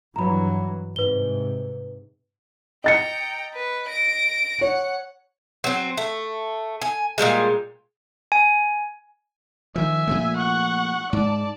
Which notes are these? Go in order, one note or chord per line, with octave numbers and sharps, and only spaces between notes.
G2 E3 F#3 A#5 B5
G#2 C3 B4 G7
D#5 G5 A#5 A6 C#7
B4
A#6 D7
C#5 F#5
F#3 C4
A3
G#5
A#2 D3 G3 G#3
G#5
D#3 F3 E5 G#5
A#2 F3 A3
F#5 C#6
G#2 D5 A5